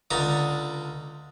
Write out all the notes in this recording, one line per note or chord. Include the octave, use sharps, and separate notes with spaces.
C#2 D3 D4 A#5